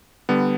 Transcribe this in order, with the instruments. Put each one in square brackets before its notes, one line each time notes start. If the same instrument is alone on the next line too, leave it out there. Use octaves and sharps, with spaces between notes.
[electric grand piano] D3 G3 B3